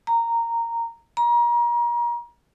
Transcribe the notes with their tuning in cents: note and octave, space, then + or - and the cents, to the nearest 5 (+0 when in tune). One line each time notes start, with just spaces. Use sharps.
A#5 -10
A#5 +35